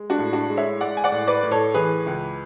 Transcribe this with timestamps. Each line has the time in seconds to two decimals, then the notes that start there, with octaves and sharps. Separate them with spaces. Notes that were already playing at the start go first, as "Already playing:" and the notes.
Already playing: G#3
0.10 D4 F#4
0.18 A2
0.33 D4 F#4
0.50 G#3
0.57 C#5 E5
0.80 G#3 D5 F#5
0.97 G#5
1.04 D5 F#5
1.12 A2
1.27 B4 D5
1.43 A2
1.51 A4 C#5
1.74 E3 G#4 B4
2.06 C#2